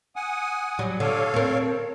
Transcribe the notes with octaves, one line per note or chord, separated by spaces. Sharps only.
F#5 G#5 D#6
F#3 G3
D3 A4 C#5 F5
C4 A#4